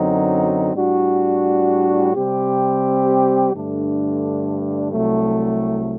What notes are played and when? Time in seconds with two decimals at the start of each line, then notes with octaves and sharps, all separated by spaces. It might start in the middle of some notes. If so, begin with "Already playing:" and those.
Already playing: F#2 D3 F#3 C4 D#4
0.73 A2 G3 D4 F#4
2.14 C3 G3 C4 G4
3.53 G2 D3 A3 D4
4.92 C2 C3 F#3 A3